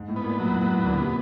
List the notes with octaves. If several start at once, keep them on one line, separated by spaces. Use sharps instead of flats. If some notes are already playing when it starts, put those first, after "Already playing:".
Already playing: G#2
A2
B3
A#2
A2 F#3
G#2
A2 B3
A2
D2 A#2
C3